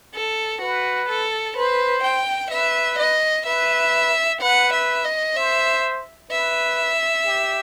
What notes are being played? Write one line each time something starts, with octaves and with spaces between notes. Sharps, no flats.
A4
F#4 B4
A4
B4 C5
G5
B4 E5
D#5
B4 E5
B4 F#5
E5
D#5
C5 E5
B4 E5
G4